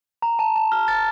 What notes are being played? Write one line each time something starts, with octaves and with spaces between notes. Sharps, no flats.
A#5
A5
A5
F6
A6